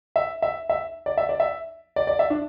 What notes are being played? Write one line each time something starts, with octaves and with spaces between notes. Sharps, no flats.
E5
E5
E5
D5
E5
D5
E5
D5
D5
E5
D4